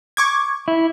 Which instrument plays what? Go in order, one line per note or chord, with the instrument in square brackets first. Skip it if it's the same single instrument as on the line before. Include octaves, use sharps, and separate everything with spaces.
[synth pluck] C#6 D6 G#6
[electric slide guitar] E4